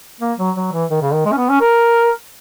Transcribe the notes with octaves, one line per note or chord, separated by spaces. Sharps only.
A#3
F#3
F#3
E3
D#3
C#3
D#3
G#3
C#4
B3
C#4
A#4